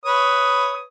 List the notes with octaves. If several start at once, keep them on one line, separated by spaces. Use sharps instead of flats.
B4 C#5 D#6